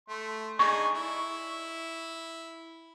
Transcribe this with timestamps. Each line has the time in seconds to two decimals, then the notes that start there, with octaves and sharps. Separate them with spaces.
0.09 A3 C6
0.59 D4 D#4 G#4 C#6
0.95 E4